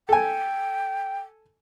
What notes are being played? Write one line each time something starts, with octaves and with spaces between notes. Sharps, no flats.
A4 G5 G#5